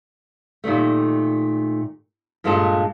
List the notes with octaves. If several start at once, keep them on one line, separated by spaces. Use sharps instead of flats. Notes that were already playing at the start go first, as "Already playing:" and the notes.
A#2 D#3 G3 A3
G2 A#2 G#3 F4 A4 A5